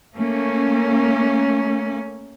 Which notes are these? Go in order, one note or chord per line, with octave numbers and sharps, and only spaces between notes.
A3 A#3 C#4